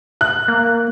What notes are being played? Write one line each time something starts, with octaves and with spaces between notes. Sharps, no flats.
F#6
A#3